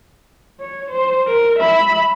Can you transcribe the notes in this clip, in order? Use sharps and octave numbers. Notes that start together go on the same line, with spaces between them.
C#5
C5
A#4
E5 B5